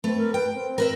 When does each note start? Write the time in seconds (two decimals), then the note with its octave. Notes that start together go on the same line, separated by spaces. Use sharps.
0.04 A3 C4 B4
0.18 A#4
0.34 B4 G5
0.53 C4
0.78 A#4 B4 E5